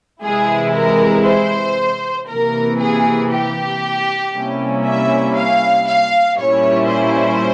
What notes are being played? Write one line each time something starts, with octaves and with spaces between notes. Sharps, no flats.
C3 E3 G#3 E4 G#4
A#4
C5
C3 E3 A#3 A#4
G#4
G4
C3 G3 A#3 C#4 E4
E5
F5
F5
A#2 G3 C#4 E4 C#5
C5